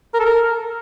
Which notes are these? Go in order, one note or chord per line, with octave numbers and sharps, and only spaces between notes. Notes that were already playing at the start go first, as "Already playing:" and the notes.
A#4
A4
A#4